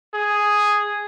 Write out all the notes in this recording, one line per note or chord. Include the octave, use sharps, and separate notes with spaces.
G#4